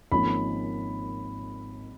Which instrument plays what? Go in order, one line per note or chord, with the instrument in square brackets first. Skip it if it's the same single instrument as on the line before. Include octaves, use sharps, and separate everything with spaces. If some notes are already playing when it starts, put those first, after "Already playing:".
[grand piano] G#1 G#2 F3 A#3 C#4 [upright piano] B5